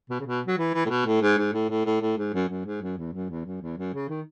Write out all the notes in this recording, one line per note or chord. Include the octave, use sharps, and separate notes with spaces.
B2
C#3
B2
F#3
E3
E3
A2
B2
A2
G#2
G#2
A2
A2
A2
A2
G#2
F#2
F#2
G#2
F#2
E2
F#2
E2
F#2
E2
F#2
C#3
D#3